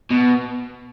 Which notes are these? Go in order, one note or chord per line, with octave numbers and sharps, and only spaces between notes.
B2